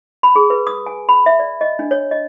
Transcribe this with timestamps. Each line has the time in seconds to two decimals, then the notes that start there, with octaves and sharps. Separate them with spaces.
0.23 B5
0.36 G#4
0.50 B4
0.67 D#6
0.86 G#5
1.09 B5
1.26 E5
1.39 D5
1.61 D#5
1.79 D4
1.91 C#5
2.11 D#5